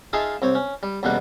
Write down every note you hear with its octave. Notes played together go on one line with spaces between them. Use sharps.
D#4 F4 G#4 E5 F5 A5
C2 C4 C#5
C#4
G3
A1 E2 B2 G3 A#3 F#5